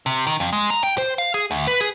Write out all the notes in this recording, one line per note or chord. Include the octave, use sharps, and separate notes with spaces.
C3
D#3
F2
G#3
A#5
G5
C5
F5
G#4
D2
B4
G#4